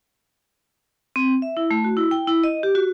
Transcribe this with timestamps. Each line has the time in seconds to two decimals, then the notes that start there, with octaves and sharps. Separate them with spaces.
1.16 C4
1.42 E5
1.57 E4
1.71 A3
1.84 F#4
1.97 E4
2.11 G5
2.27 E4
2.44 D#5
2.63 G4
2.75 F#4